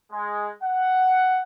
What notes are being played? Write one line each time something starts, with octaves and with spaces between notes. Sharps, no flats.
G#3
F#5